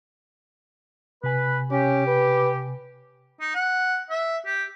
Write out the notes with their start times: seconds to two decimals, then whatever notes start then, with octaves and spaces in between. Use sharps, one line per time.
1.24 C3 B4 G#5
1.71 C#4 G4
2.07 B4
3.41 D#4
3.54 F#5
4.10 E5
4.46 G4